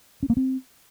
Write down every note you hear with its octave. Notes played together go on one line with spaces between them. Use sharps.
C#4
A#3
C4